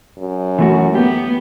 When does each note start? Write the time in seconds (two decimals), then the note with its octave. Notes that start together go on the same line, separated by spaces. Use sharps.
0.18 F#2
0.59 E3 A3 F#4
0.95 B3 G4